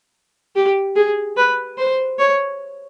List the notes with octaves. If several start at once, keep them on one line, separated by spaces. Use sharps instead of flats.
G4
G#4
B4
C5
C#5